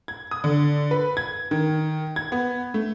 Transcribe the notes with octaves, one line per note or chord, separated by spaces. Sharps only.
G#6
D#6
D3
B4
G#6
D#3
G#6
B3
A3